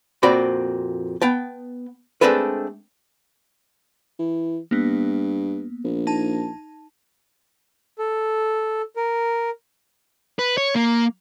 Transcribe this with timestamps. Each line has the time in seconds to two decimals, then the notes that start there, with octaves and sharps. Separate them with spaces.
0.23 F2 A#2 C4 F#4 D5 B5
1.22 B3 G5 A5
2.21 G#3 A3 C4 D4 A4 B4
4.19 E3
4.71 G2 A#3 B3
5.84 A#1
6.07 D#4 A5
7.98 A4
8.96 A#4
10.39 B4
10.58 C#5
10.75 A#3